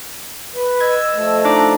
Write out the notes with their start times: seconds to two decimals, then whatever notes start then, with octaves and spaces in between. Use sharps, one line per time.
0.55 B4
0.81 D#5 E6 G#6
1.15 F3 A3
1.45 D4 D#4 A#5 D6